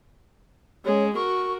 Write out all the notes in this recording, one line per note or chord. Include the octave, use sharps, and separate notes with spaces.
G#3 C#4 C#5
F#4 A#4 C#6